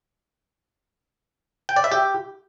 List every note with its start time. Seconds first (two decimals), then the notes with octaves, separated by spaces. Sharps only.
1.69 G5
1.76 D5
1.84 E5
1.92 G4